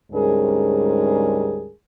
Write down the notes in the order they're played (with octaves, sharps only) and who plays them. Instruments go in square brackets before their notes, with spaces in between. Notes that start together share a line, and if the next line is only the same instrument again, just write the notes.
[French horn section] D2 G#2 G3 C#4 G#4 A#4